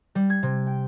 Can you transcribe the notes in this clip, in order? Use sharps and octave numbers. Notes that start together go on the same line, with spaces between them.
G3
G#6
C3
G5